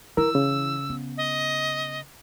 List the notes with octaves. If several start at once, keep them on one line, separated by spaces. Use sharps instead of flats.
E3 E4 A#4 E6
C#3
B3
D#5